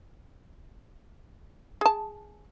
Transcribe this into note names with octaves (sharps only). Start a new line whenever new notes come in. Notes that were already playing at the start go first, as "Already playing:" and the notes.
G#4 A5